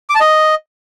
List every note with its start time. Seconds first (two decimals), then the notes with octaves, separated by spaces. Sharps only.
0.10 D6
0.15 A5
0.20 D#5